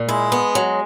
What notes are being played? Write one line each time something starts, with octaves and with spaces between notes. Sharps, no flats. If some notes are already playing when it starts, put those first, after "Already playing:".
Already playing: A#2
G#3 E4
B3
F#3